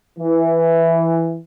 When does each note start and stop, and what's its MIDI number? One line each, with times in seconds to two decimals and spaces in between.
0.19 1.37 52